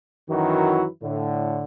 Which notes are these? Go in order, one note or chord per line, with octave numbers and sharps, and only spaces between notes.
F#2 D#3 E3 F#3 E4 F#4
A2 D3